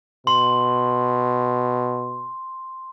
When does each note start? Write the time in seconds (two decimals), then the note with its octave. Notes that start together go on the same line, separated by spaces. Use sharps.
0.27 B2 C6